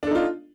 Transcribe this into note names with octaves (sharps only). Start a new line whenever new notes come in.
D4 D#4 F4 A4